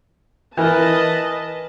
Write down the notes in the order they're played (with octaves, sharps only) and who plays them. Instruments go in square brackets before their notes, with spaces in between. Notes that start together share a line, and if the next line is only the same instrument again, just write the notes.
[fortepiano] E3 A#4 [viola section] B4 D#5 A5